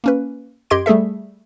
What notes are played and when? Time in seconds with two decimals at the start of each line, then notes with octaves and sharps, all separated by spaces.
0.04 A#3 C#4 B4
0.70 F#2 G4 D#5 C6 G#6 D7
0.86 G3 A3 G#4 A4 E5